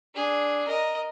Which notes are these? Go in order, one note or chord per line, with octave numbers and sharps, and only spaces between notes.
D4 G#4
A#4 D#5